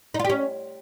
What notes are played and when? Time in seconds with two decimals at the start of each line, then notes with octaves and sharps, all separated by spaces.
0.14 D#4
0.19 F4
0.25 G4
0.30 C#4